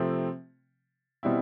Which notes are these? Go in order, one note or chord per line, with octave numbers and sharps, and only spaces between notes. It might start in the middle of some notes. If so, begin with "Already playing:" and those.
Already playing: C3 F3 A3 C4
B2 G3 C4 E4